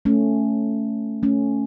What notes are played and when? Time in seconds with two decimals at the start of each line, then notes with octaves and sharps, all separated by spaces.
0.05 A3 C#4
1.23 A3 C#4